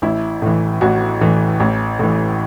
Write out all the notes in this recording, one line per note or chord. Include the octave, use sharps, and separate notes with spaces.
A1 E4
A2 E3
A1 F#4
A2 E3
A1
A2 E3